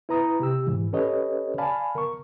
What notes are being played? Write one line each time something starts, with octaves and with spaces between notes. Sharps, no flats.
E4 B4 A#5 D#6
C3 G4 E6
G#2 E3
C#4 G4 A4 B4 C#5 D#5
D5 F5 G#5 A5 B5
A#4 C#6